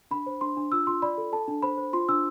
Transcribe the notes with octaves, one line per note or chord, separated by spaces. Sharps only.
D4 B5
C5
D4 C6
D4
F4 E6
F4 C6
D5 B5
A4
A4 A5
D4
C5 B5
C5
F4 C6
D4 E6